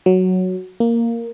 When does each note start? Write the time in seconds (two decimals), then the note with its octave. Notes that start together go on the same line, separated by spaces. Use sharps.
0.06 F#3
0.80 A#3